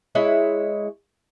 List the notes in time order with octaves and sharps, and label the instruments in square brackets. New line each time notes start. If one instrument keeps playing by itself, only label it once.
[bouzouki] G#3 E4 C#5